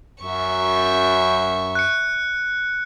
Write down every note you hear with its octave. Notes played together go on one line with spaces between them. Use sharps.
F#2 E5 C#6
F#6 C#7